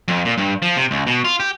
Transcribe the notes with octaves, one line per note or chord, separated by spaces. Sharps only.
F2
A#2
G2
F3
C3
C#2
B2
F4
G4